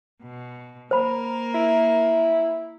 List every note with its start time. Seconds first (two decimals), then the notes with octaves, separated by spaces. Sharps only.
0.22 B2
0.91 A#3 A#4 C5 B5
1.55 E4